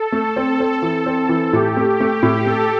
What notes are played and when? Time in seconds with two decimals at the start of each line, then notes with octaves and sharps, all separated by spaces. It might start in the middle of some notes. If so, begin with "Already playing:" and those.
Already playing: A4
0.12 A3
0.36 C4
0.60 C4
0.82 E3
1.06 C4
1.29 E3
1.53 A2 G4
1.77 A3
2.00 A3
2.23 A2
2.46 A3 A4